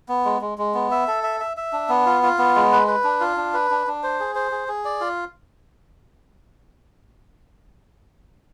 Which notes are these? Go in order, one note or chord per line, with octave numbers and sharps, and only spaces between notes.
B3
G#3
G#3
G#3
B3
E5
A4
E5
E5
E5
D4
B3
F4
F4
B3
G#3
B4
B4
D4
F4
D4
B4
D4
D4
C5
G#4
C5
G#4
G#4
D5
F4